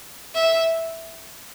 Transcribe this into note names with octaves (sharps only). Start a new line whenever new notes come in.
E5